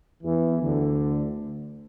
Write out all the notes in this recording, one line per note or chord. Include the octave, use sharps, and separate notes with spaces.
E2 E3
D2 D3